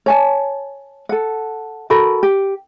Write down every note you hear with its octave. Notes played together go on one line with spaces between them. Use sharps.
C#5 G#5 A5
A4 F#5
F#4 A4 A#4 B5
G4